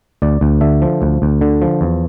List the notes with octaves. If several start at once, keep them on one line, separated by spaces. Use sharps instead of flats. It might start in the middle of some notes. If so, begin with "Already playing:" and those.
D2 D5
D2
D3 E5
F3
D2
D2
D3
F3
E2